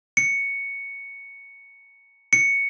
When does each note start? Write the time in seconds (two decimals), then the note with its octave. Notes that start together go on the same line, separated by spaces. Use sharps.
0.17 C#7
2.33 C#7